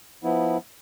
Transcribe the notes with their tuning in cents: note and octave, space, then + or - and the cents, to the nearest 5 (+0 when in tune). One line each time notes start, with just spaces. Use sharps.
F3 +0 B3 +0 E4 -15